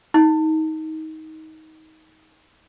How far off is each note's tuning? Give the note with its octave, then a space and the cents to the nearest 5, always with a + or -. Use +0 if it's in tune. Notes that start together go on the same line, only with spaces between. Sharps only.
D#4 +20